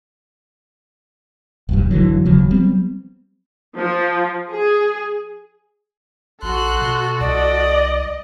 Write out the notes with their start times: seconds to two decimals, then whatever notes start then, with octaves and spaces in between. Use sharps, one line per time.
1.69 D#1 B1 G2
1.91 F1 D3 E3 F#3
2.25 D#1 C#3 F3 F#3
2.50 F#3 G3 B3 C4
3.76 F3
4.51 G#4
6.43 A#1 F#4 A4 C6 F#6
6.82 B2
7.21 C2 D5 D#5